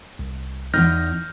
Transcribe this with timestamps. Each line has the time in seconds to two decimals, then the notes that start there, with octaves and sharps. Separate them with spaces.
0.19 C2
0.74 E2 G2 D#4 F6 G6 A#6